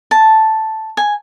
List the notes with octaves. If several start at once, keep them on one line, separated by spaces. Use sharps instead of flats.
A5
G#5